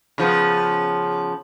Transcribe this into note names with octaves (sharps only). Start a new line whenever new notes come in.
C#3 F3 B3